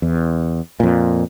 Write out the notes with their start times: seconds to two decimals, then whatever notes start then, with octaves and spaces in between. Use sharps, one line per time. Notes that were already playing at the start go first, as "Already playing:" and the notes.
0.02 E2
0.80 F2 A#2